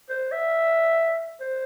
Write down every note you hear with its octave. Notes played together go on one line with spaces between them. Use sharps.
C5
E5
C5